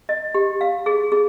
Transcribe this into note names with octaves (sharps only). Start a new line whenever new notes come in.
D#5
G4
F5
G#4
G#4